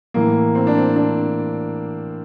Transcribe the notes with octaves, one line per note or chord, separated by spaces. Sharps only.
A2 E3 A#3
C4
D4
C4
D4